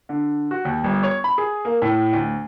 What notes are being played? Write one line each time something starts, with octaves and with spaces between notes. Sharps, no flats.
D3
F#4
D#2
G1
C#5
B5
G#4
A#3
A2
D2